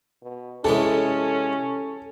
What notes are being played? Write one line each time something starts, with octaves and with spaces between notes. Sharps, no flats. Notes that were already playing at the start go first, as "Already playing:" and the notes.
B2
C3 E3 G#3 C#4 A4